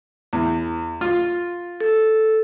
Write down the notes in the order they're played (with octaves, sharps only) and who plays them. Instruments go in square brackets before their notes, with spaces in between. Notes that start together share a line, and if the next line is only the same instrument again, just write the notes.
[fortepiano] E2
F4
[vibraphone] A4